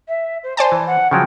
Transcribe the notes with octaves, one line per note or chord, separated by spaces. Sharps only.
E5
C5
C5 D5 G#5 A5
E3
F#5
C#3 F3 F#3 G5